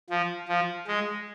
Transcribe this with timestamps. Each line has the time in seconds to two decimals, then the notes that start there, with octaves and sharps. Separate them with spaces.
0.10 F3
0.49 F3
0.87 G#3